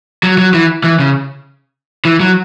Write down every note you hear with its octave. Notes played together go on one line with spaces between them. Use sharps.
F#3
F#3
E3
E3
C#3
E3
F#3